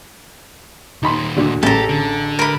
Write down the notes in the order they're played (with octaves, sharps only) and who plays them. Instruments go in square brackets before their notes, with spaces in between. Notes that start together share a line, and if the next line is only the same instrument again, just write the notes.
[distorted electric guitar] D#2 A#2 [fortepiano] D#4 B5 C6
[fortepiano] D2 D3
[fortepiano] A1 C#3 A5 [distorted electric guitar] G4 [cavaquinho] A4 A#5
[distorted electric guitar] D3
[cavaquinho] A#4 B5